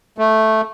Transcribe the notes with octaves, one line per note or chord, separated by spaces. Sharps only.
A3